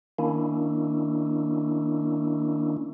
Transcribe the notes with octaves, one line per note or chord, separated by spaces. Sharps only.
D#3 A#3 C#4 D4 E4